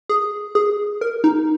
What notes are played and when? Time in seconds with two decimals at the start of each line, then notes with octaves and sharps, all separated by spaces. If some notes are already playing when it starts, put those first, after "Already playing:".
0.09 G#4
0.55 G#4
1.01 A#4
1.24 D#4